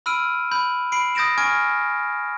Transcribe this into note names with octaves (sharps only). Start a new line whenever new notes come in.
B5 E6 F6 D7 D#7
B5 G6
B5 C7 D7
D#6 G6 A6 A#6 D7 E7
G#5 C#6 F6 G#6 D7